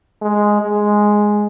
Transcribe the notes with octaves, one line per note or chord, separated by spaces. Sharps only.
G#3
G#3